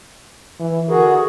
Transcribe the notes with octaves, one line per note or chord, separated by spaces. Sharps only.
E3
D3 F#4 G#4 A#4